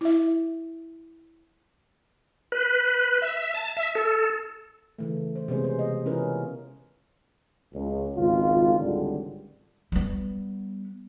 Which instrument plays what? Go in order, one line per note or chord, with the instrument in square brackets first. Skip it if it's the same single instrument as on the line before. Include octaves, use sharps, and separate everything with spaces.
[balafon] E4 E5
[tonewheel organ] B4
E5
A5
E5
A4
[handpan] C#3 E3 A3
C5
C3 G#3 B3 C#4 G#4 C5
C5
D#5
E3 C#4 E4 F4 A#4 B4
[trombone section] C#2
G#1 C#2 F4
G#1 C#2 D3 G3
[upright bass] G3 B3